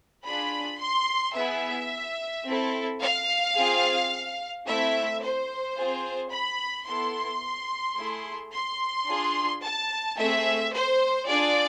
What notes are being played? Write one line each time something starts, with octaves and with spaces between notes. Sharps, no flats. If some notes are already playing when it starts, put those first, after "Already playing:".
D4 F4 G#4 B5
C6
B3 E4 G#4 E5
C4 E4 A4
F5
C4 F4 G#4
A3 C4 E4 E5
C5
C4 F4 G#4
B5
B3 E4 A4 C6
A3 E4 G#4
C6
D4 F4 G#4
A5
A3 C4 G#4 E5
C5
D4 F4 G#4 D5